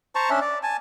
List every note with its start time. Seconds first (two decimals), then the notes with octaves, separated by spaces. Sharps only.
0.15 C5 A5 A#5 C#6
0.30 C#4 D4 E5
0.41 D5
0.63 G#5 A5